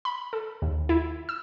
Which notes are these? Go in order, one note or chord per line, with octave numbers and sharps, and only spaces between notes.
B5
A4
D#2
E4
E6